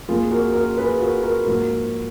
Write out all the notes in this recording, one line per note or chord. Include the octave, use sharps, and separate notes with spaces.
F2 F3 A#3 F4 G#4
F#4 A#4
F#4 A#4
G#4 B4
F#4 A#4
F#4 A#4
G#2 F3 A#3 F#4 A#4